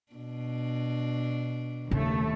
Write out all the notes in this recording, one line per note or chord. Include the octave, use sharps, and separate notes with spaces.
B2 D4
D#2 C#3 A3